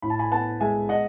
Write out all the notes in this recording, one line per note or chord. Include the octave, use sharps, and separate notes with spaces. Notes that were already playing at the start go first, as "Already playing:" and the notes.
A2 B5
A5
G#5 B5
B3 F#5 A5
G#3 E5 G#5
D#5 F#5